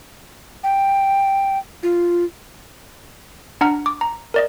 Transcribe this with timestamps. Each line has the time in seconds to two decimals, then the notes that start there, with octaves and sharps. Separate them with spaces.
0.64 G5
1.83 F4
3.61 D4 F#5 A#5 F6
3.86 D6
4.01 A#5
4.34 A#4 D5 D#5